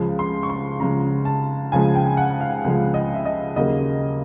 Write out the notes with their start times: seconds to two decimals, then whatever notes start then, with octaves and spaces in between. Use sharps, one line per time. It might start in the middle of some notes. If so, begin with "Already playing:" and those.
Already playing: C#2 C#3 F3 G#3
0.19 C6
0.43 C#6
0.50 C6
0.80 C#2 C#3 F3 G#3 A#5
1.25 A5
1.72 C#2 C#3 F3 G#3 G#5
1.95 G5
2.17 F#5
2.41 F5
2.64 C#2 C#3 F3 G#3
2.94 D#5
3.14 E5
3.25 D#5
3.56 D#2 C#3 F#3 A#3 D#5